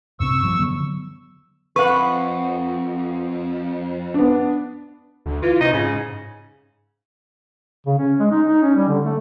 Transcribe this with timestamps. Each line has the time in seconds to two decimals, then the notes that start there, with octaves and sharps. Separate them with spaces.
0.20 G2 C3 C4 C#6 E6
0.43 F3 G3
0.58 D3 F#3 B3
1.76 F2 B4 F#5 C#6
4.14 B3 D4
5.26 D2
5.42 E3 F4
5.61 C3 D#4
5.73 G#2 C#3
7.86 C#3
7.98 C#4
8.19 G#3
8.31 D#4
8.47 D#4
8.62 C#4
8.76 G3
8.88 D3
9.05 A3